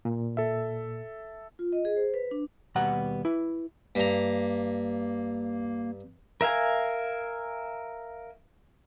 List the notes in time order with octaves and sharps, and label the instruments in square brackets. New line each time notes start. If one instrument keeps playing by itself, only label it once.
[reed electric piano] A#2
[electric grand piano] A4 E5
[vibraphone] F4
D#5
G#4
C5
B4
D4
[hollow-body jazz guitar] D#2 B2 G3 B3 F#5 A#5
E4 B4
[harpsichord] G2 A#5 [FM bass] A#3
[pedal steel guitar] A#4 E5 F5 G#5